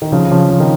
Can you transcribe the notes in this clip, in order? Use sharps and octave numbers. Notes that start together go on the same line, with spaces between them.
D#3
C#3 F3
C#3 F3
F3
D#3